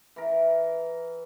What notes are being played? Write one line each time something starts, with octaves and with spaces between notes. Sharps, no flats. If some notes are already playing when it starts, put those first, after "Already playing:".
E3 A#4